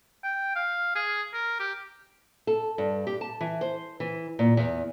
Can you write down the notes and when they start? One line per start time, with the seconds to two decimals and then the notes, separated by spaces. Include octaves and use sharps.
0.24 G5
0.56 F5
0.95 G#4
1.33 A#4
1.59 G4
2.47 A4
2.78 G2
3.07 G4
3.21 A5
3.41 E3
3.61 C5
4.00 E3
4.39 A#2
4.57 E2